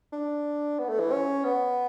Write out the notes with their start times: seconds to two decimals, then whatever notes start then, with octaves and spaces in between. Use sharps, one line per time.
0.12 D4
0.79 B3
0.89 A3
1.00 E3
1.12 C#4
1.44 B3